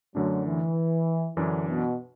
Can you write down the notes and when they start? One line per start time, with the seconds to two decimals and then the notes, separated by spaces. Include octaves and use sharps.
0.15 F#2 D3 F#3 A3 D4
0.45 E3
1.37 F#2 D3 E3 D4
1.67 B2